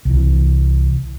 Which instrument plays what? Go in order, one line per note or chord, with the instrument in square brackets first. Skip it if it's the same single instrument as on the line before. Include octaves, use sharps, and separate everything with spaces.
[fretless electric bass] C2 E3